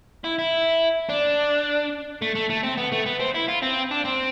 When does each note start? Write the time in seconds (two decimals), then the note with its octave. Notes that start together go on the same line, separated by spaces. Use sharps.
0.24 E4
0.39 E4
1.09 D4
2.22 A3
2.35 A3
2.50 A3
2.63 C4
2.77 B3
2.92 A3
3.06 B3
3.20 C4
3.34 E4
3.48 F4
3.62 C4
3.91 D4
4.05 C4